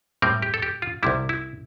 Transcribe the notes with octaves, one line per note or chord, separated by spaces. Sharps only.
A2 G3 C4 A#4
G4
A4
G4
F4
C2 C3 G3 E4
E4